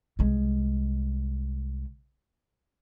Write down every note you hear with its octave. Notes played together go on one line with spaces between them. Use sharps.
C2 G#3